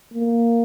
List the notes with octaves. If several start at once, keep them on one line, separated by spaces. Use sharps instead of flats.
A#3